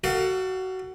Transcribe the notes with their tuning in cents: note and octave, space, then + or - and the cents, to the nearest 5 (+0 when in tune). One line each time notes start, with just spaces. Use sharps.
F#4 +20 A4 +35 F5 +0